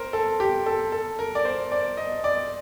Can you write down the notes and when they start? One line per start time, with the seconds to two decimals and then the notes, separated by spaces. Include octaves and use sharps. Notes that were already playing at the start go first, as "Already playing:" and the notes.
Already playing: A#4 C5
0.13 A4
0.40 G4
0.66 A4
0.92 A4
1.19 A#4
1.35 D5
1.45 C5
1.72 D5
1.97 D#5
2.24 D5